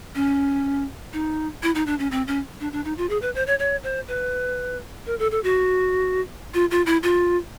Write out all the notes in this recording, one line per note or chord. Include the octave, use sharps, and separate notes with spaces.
C#4
D#4
E4
D#4
D4
C#4
C4
C#4
D4
D4
D#4
F4
G#4
B4
C5
C#5
C#5
C5
B4
A#4
A4
A4
F#4
F4
F4
E4
F4